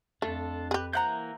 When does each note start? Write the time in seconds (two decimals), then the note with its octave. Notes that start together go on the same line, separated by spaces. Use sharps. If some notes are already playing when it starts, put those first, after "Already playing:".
0.22 F2 A3 D4 F4 A4
0.71 G4 G#4 B4
0.93 C3 E3 A#3 F#5 A#5 G6